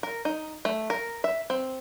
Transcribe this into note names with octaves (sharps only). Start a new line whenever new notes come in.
A#4
D#4
A3
A#4
E5
C4